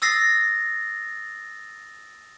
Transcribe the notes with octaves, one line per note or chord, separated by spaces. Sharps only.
D#6 E6 A6 A#6 C7